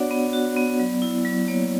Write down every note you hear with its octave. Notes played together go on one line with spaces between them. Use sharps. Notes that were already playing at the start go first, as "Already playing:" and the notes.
Already playing: B3 D4 F#4 C#5 D5 F#5
B3
F#4
B3
F#3
E4
F#3
A#3 C#5